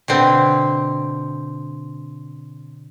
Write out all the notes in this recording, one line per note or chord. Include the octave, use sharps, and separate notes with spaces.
B2 D3 C4